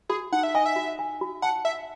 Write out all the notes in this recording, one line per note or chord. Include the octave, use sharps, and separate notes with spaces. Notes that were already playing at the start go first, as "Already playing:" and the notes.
F#4 G#4
D#4 F#5
E5
D#5 G#5
E5
F#4
G#5
F#4
F#5 A5
E5 F#5